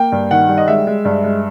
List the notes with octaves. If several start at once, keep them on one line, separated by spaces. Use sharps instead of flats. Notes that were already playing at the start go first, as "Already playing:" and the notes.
Already playing: A#3 G5
G2
D#3 F#5
G3
D#5
G#3 E5
G#3
G2
G#3